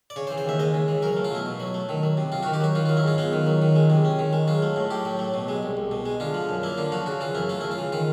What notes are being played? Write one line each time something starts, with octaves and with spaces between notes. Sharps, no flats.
D5
C#3 C#5
C5
E3
C5
D#2 E5
G#3 D#5
C#3
E3
F#3 A#4
A3
F4
B2 E4
B2
F#3
A3
D#3
F#3
C3
C3 F4
D#3 F#4
G4
F#3 F#4
D#3 F4
F#3 F4
E4
G#2 F4
B3 F4
D#3
F#3
D#3
G#3
C3
C#4
D#3
G#3
F#3 F4
A3
A2
A2 G4
F#3
A3
B2
G#3
C2
C2
B2
G#3
D3 F4
F3
F#2
A#3 E4
D3 F4
F3 F#4
C#3 F#4
E3 F4
F#2 E4
A3 F4
C#3 E4
F4
E3
D#3 F4